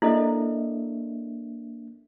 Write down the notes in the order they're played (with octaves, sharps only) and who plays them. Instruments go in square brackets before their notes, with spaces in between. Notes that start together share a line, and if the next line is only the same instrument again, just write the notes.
[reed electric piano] A#3 D4 E5 [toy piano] E4 A4 D#5